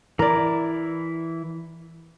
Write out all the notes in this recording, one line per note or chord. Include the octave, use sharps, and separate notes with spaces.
E3 E4 A#4 D5